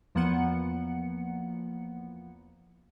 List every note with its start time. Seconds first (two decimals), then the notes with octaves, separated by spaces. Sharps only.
0.15 E2 F3 A#3 B3 F#5 C#7